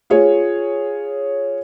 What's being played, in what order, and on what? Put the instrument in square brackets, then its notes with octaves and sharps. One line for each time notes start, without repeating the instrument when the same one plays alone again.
[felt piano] F4 G#4 C#5